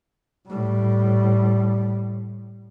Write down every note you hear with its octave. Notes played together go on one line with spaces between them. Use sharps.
A2 G3